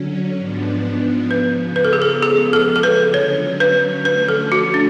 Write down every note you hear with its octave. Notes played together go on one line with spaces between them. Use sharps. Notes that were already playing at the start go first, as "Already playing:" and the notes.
Already playing: D3 F#3 C#4
G#2 F3 B3 D4
C#3 F3 B3 B4
B4
A4
G#4
A4
C#3 F3 G#3 B3 G#4
A4
A4
B4
D3 F#3 C#4 C#5
B4
D3 F3 A3 C#4 B4
A4
F#4
D4